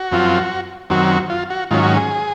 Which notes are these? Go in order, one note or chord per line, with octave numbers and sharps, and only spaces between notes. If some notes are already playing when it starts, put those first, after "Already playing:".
Already playing: F#4
F#2 F3 C4 F4
F#2 D#3 F#3 C4 F#4
F4
F#4
G#2 D#3 F#3 C#4 F4
F#4
G#4